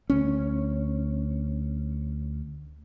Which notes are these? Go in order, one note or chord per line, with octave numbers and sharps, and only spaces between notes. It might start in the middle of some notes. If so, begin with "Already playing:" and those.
D2 C#4